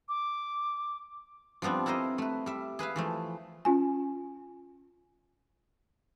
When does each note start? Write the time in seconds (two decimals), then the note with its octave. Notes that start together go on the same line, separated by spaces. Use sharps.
0.08 D6
1.62 F3 G3 B3 C4 D4
1.86 E4 A4 A#4 C5 D#5
2.18 A3 B4
2.46 G3 E5
2.79 G#4 B4 E5 F5
2.96 E3 F3 A3
3.65 C#4 F4 G#5